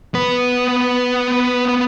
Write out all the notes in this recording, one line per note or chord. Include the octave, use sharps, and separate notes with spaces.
B3 B4